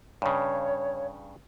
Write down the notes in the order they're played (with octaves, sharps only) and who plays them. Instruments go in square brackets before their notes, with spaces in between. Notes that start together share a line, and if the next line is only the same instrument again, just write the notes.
[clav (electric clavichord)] G2 C#3 [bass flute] C#5